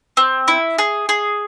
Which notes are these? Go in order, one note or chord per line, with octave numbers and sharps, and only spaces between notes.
C4
E4
G#4
G#4